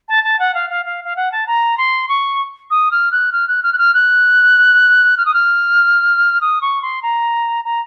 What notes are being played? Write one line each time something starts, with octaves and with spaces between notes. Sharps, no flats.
A5
A5
F#5
F5
F5
F5
F5
F#5
A5
A#5
C6
C#6
D#6
F6
F#6
F6
F#6
F6
F#6
F6
F#6
F6
D#6
F6
D#6
C#6
C6
A#5
A#5